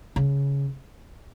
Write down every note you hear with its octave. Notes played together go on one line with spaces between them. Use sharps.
C#3